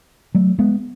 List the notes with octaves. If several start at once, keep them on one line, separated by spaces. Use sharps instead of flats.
F#3 A3
G#3 B3